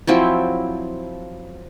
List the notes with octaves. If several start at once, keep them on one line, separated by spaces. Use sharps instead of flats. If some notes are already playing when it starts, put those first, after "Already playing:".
F3 F#3 C4 E4